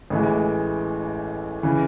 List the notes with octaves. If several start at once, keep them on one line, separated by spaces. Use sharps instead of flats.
A1 A2 E3 G#3
C#3 E3